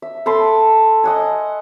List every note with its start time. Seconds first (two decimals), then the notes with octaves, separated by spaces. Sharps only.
0.02 E5
0.26 A4 A5 B5 C6
1.04 D#5 F#5 G#5